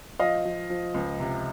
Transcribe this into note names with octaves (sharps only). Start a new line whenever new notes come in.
F3 D#5 F5
F3
F3
C#2
C3